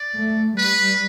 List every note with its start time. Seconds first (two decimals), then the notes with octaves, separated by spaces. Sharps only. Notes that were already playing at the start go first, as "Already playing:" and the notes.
Already playing: D5
0.16 A3
0.57 G3 B4